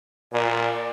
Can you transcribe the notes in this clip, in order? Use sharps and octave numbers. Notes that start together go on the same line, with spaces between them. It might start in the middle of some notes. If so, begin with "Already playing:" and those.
A#2 D5